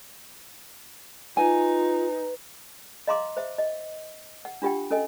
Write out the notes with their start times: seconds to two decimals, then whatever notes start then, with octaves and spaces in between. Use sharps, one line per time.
1.37 D#4 F4 B4 G#5
3.07 D#5 F5 A#5 C6 D6
3.37 C5 E5
3.58 D#5
4.45 F#5
4.62 D4 F4 G4 F#5 G5
4.91 C#4 A4 D#5 G#5